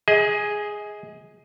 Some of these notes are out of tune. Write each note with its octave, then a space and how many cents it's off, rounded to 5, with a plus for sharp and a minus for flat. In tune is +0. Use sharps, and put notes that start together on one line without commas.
G#4 +0 D#5 +30